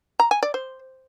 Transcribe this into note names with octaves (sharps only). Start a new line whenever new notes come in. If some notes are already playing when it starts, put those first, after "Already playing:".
A#5
G#5
D5
C5